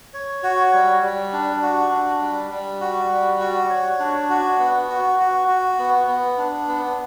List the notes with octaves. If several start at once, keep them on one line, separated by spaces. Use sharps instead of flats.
C#5
F#4
G3
G3
D4
F#4
D4
G3
G3
F#4
G3
F#4
C#5
D4
F#4
B3
F#4
F#4
F#4
B3
B3
D4
B3